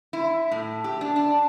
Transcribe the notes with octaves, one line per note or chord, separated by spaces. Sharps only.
E4
A2
G4
D4
D4